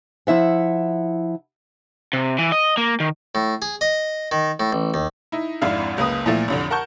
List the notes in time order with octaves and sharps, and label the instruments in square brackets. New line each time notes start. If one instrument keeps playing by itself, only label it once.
[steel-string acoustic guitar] F3 E4 E5 F#5
[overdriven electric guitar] C3
E3
D#5
A#3
D#3
[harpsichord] A2
G#4
D#5
D#3
A2
A1
D#2
[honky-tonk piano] D#4 E4
G#1 F2 G#2 D4 E4 F5
F#1 C#2 A#3 B4 D#6
A#2 E3 F3 A3
A1 F2 D3
A#4 F#5 A5 C#6 G6